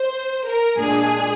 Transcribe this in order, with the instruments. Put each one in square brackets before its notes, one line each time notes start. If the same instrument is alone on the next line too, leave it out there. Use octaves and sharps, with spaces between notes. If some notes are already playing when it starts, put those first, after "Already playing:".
Already playing: [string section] C5
A#4
A#2 G#3 D4 G#4